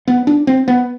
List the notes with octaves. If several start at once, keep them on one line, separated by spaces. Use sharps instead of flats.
B3
D4
C4
B3